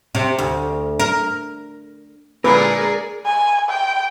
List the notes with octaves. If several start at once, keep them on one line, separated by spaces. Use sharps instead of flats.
C3
D2
A#4
A#2 D3 G#3 G#4 A#4 B4 D5
G#5
G5